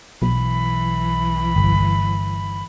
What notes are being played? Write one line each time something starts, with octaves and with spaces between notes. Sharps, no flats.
B1 E3 B5
G1